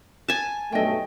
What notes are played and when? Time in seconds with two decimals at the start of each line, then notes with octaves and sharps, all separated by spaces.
0.28 G#5 A5
0.72 B1 G2 A3 D#5 G5